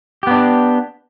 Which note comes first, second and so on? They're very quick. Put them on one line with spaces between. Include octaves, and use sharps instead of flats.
G4 B3 D4